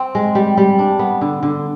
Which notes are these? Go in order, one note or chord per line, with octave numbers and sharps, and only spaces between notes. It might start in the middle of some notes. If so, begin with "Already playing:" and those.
Already playing: C4
G#3
G3
G3
D4
B3
D3
D3